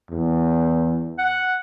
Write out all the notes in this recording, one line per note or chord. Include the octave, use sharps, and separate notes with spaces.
E2
F#5